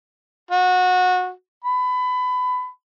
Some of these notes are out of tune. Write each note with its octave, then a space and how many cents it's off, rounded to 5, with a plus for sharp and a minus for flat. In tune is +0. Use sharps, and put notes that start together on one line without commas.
F#4 -20
B5 +25